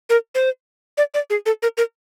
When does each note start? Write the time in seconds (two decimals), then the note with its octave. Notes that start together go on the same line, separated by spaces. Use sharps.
0.10 A#4
0.35 C5
0.98 D5
1.14 D5
1.30 G#4
1.46 A4
1.62 A#4
1.78 A#4